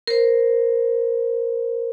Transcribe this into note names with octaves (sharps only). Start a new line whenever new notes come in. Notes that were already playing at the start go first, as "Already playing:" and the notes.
A#4 C5